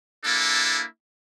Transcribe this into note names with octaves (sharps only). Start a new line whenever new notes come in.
A#3 D4 E4 A4